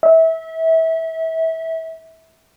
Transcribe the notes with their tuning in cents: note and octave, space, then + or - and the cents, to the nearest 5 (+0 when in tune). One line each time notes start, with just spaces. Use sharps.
E5 -25